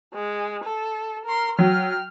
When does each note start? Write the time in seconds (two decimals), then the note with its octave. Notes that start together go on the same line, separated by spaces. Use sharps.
0.14 G#3
0.64 A4
1.25 A#4 C6
1.59 F#3 G5 F6